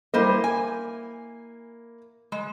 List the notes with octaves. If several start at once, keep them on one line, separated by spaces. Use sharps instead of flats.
G3 A#3 E4 C5 D#5
G#5
G#3